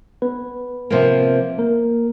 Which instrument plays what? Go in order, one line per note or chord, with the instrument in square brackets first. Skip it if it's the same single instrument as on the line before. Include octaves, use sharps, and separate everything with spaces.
[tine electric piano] B3 B4
[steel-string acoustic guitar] C3 F3 A#3
[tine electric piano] A#3 A#4